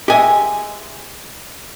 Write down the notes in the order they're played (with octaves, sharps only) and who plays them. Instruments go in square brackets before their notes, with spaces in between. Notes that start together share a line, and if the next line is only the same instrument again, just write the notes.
[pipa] G#3 G#5 [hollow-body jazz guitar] G4 D#5 E5